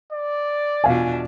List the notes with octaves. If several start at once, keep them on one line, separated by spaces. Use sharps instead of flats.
D5
E2 B2 D4 F4 F5 G#5